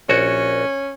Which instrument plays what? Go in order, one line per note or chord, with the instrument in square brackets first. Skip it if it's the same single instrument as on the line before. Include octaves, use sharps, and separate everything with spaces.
[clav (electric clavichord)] A#1 F#4 [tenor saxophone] C#4